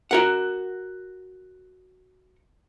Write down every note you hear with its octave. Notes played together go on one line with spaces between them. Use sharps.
F#4 A#4 F#5